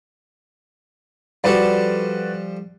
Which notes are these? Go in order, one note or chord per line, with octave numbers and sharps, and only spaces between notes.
F3 G3 F#4 A4 B4 D5